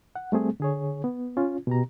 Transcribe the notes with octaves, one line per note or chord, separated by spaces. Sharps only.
F#5
G3 A3 C4 G#4
D3 G#4 C#5
B3
C#4 F4
B2 G4 A#5